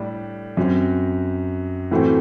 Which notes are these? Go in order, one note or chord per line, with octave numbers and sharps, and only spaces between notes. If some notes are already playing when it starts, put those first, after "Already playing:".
Already playing: A2 G3 D4
F#2 F#3 C4
A2 E3 A3 C4 F#4